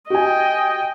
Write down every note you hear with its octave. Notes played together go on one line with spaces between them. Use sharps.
F#4 G4 D#5 G5 G#5